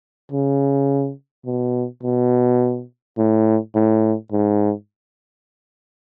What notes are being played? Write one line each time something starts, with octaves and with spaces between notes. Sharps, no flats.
C#3
B2
B2
A2
A2
G#2